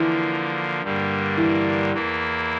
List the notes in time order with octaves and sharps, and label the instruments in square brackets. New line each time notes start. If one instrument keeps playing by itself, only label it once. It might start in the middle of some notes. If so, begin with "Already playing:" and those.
Already playing: [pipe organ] D3 F3 A#3 [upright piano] E3
[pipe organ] G2 D3 G3 A#3
[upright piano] E3
[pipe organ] E2 E3 A#3 E4